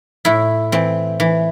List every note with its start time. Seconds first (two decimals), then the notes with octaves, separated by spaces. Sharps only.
0.25 A2 E4
0.72 E3 C4
1.20 E3